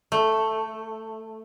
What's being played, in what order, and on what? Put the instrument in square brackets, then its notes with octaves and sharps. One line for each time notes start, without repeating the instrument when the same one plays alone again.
[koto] A3